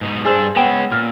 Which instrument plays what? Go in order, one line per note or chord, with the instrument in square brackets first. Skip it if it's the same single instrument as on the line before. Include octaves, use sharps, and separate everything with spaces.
[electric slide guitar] G#2 B2 D#4
[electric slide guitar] G2 D4 [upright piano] G#4 C5 E6
[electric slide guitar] G#3 C#4 [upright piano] B3 [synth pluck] G5 E7
[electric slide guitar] A#2 [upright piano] F6